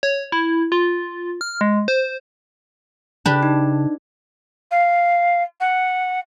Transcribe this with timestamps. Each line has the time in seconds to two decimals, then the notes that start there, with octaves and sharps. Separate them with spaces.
0.03 C#5
0.32 E4
0.72 F4
1.41 F6
1.61 G#3
1.88 C5
3.26 C#3 D4 G4 B4
3.43 D#4
4.71 F5
5.60 F#5